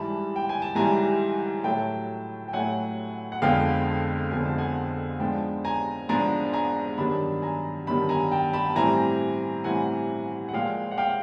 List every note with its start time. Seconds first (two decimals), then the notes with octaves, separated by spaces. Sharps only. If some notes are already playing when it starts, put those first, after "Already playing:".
Already playing: G#2 E3 G3 A5 B5
0.36 G5
0.49 G#5
0.62 A5
0.75 G#2 E3 G3 G#5 A#5
1.64 A2 F#3 A3 G5 A5
2.48 G5
2.53 A2 F#3 A3 F#5 G#5
3.32 F#5
3.42 F2 D3 F3 G#3 B3 F5 G5
4.31 F2 D3 F3 G#3 B3 G#5
4.45 A5
4.58 F#5 G#5
5.20 G#2 F3 G#3 B3 D4 G5 A5
5.65 G#5 A#5
6.09 G#2 F3 G#3 B3 D4 G#5 A#5
6.53 G#5 A#5
6.97 G2 D#3 F#3 B3 D4 A5 B5
7.42 G#5 A#5
7.87 G2 D#3 F#3 B3 D4 A5 B5
8.09 G#5 A#5
8.32 G5 A5
8.53 A5 B5
8.76 A2 E3 G3 C4 G#5 A#5
9.64 A2 E3 G3 C4 F#5 G#5
10.49 F#5
10.53 A#2 F3 G#3 F5 G5
10.91 F#5
10.98 F5 G5